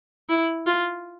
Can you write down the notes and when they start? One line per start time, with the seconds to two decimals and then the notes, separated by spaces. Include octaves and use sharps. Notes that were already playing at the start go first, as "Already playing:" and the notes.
0.29 E4
0.67 F4